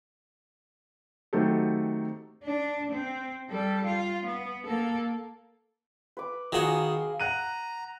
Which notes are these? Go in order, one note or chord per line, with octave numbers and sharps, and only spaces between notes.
D#3 F#3 A3 C4 G4 A4
D4
C4
G3 A4
F4
B3
A#3 A4
B4 D6
D#3 F#4 G#4 F5 G#5
F#5 A#5 F#6 D#7